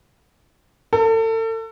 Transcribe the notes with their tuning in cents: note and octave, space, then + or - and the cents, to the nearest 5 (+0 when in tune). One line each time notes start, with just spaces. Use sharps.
A4 +35